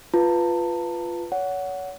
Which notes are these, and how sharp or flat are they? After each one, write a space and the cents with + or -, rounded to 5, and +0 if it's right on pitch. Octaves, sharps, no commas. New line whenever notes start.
F4 -5 B4 +0 A5 +25
C#5 +35 F#5 +0